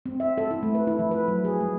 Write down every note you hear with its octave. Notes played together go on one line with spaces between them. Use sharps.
C4
E5
A4
E4
A3
B4
E4
F3
B4
F#3
G#4
G#3